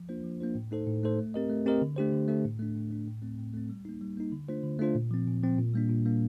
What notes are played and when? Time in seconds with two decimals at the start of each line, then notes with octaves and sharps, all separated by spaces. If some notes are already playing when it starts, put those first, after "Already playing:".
Already playing: F3
0.09 A#3 D4 F4 C5
0.24 F3
0.40 A#3 D4 F4 C5
0.55 A2
0.71 A3 D#4 A4 C5
0.87 A2
1.03 A3 D#4 A4 C5
1.19 A3
1.34 C4 G4 A#4 D#5
1.50 A3
1.66 C4 G4 A#4 D#5
1.82 D3
1.96 A3 D4 G4 C5
2.12 D3
2.28 A3 D4 G4 C5
2.45 A2
2.59 A3 D4
2.76 A2
2.91 A3 D4
3.07 A2
3.22 A3 C4
3.39 A2
3.54 A3 C4
3.70 G3
3.85 A#3 D#4
4.01 G3
4.17 A#3 D#4
4.32 D3
4.48 A3 D4 F4 C5
4.63 D3
4.79 A3 D4 F4 C5
4.95 A#2
5.11 F3 C4
5.27 A#2
5.43 F3 C4
5.58 A#2
5.74 G3 A#3 D4
5.89 A#2
6.05 G3 A#3 D4